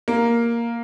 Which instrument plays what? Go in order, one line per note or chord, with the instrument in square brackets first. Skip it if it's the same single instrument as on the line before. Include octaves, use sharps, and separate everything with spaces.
[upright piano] A#3